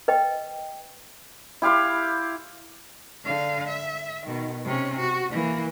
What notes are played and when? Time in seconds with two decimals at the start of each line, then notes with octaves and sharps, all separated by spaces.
0.08 B4 D#5 G5
1.62 E4 G4 F5 C6
3.25 D3 F5
3.68 E5
4.26 B2 D#3
4.65 C3 C#4
4.99 F#4
5.31 E3 A#3